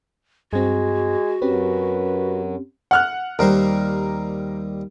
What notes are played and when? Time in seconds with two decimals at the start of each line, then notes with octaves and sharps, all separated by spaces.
0.53 G2 G#3 C4 F#4
1.42 F#2 C4 C#4 G4 B4
2.91 F#5 F6 F#6
3.39 D#2 G3 A#4 C5